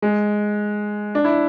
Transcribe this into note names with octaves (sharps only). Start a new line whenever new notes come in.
G#3
D4
E4